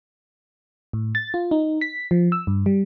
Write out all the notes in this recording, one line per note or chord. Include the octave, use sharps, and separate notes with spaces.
A2
A6
F4
D#4
B6
F3
E6
G2
G3